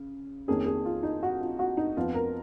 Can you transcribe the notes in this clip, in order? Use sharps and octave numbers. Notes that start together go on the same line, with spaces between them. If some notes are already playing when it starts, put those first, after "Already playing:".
Already playing: C#3
F2 D#3 A#3 C#4 G#4
G#4
F4
D#4
F#4
F4
F#4
D#4
F2 F3 B3 F4
A#4